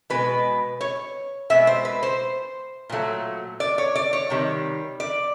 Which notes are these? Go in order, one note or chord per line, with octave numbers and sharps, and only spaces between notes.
B2 G#3 B4
C#5
B2 G#3 E5
C5
B4
C5
A#2 F#3 A3
D5
C#5
D5
C#5
C3 D#3 G3
D5